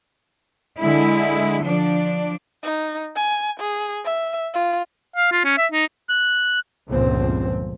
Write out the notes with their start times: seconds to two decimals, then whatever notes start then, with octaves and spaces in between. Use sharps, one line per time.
0.79 D3 G#3 E4
1.62 F3 D4
2.63 D#4
3.15 G#5
3.60 G#4
4.04 E5
4.54 F4
5.16 F5
5.32 F4
5.44 C#4
5.58 E5
5.72 D#4
6.09 F#6
6.87 G1 C#2 A#2 F3 C4